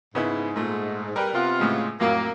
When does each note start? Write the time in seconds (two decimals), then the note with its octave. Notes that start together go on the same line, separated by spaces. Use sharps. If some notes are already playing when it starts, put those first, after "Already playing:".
0.15 G#2 C#3 B3 E4
0.56 A#2 A3
1.16 G3 A#4 B4 G5
1.34 C3 B3 F4
1.59 A2 C#3 G#3
2.00 F2 A2 F#3 A#3